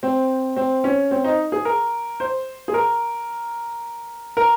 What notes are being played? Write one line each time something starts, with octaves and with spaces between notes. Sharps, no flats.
C4
C4
C#4
C4
D#4
G#4
A#4
C5
G#4
A#4
A#4